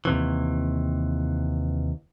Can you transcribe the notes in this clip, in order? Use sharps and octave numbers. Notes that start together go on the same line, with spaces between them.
D#2 C3 E3